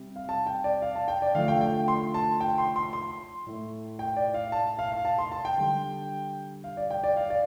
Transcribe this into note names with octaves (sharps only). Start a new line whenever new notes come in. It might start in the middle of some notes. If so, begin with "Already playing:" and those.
Already playing: C3 G3
F5
A5
G5
D5
F5
A5
G5
D5
D3 F3 A3 F5
G5
G5
C6
A5
G5
C6
C6
C6
A2 A3
G5
D5
F5
A5
F5
F5
A5
C6
A5
G5
D3 G3
F5
D5
G5
D5
F5
D5